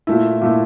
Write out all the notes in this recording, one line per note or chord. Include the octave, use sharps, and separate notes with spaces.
A#2 A3 E4
A#2 A3 E4